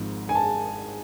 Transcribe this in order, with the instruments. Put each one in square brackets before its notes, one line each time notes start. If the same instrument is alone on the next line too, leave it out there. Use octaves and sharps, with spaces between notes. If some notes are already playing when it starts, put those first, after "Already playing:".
Already playing: [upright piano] G#1 G#2 F3 G#3
G#5
A5